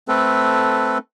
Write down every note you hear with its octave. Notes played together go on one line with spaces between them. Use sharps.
A3 C4 A4 B4